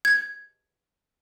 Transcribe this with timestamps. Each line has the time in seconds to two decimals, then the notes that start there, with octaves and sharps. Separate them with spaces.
0.05 G#6